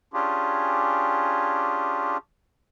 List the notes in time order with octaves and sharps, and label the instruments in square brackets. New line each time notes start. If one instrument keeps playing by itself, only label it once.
[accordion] C#4 D4 F4 G4 G#4